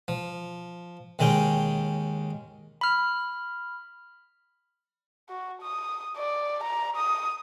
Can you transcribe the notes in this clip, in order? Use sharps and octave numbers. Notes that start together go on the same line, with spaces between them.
F3
D#2 D#3 G#3 C#4 G5
B5 F6
F#4
D#6
D5
A#5
D#6